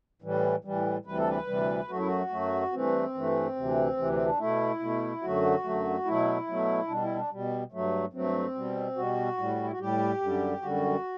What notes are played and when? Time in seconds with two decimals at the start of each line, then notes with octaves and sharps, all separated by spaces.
0.22 A2 E3 G3
0.64 A2 E3 G3
1.05 D2 C3 E3 G3 B4
1.17 A4
1.28 B4
1.47 D2 C3 E3 G3
1.89 F#2 F#3 A3 F#4
1.98 E4
2.06 F#4
2.30 F#2 F#3 A3
2.72 G2 E3 A3 C4
3.14 G2 E3 A3
3.56 D2 C3 E3
3.97 D2 C3 E3
4.13 C4
4.26 D4
4.38 B2 A3 E4
4.80 B2 A3
5.22 F#2 D3 F#3 A3 F#4
5.64 F#2 D3 F#3 A3
6.05 B2 F#3 A3 E4
6.47 B2 F#3 A3
6.88 B2 G3 D4
7.02 E4
7.15 D4
7.30 B2 G3
7.72 G2 F#3 A3
8.13 G2 F#3 A3 C4
8.55 B2 G3
8.96 B2 G3 F#4
9.37 A2 G3
9.63 E4
9.71 F#4
9.80 A2 G3 G4
10.21 F#2 D3 G3
10.62 F#2 D3 G3 F#4